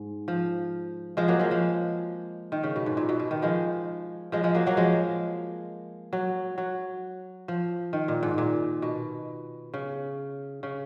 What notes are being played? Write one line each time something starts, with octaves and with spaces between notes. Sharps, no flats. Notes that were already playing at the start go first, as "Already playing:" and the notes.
Already playing: G#2
F3
F3 G#3
F#3 A#3
F3 G#3
F3
D#3
C#3
B2
G#2
A#2
B2
B2
D#3
F3 G#3
F3 G#3
F3 G#3
F#3 A#3
F#3 A#3
F3 G#3
F#3
F#3
F3
D#3
A#2
G#2
A#2
B2
C#3
C#3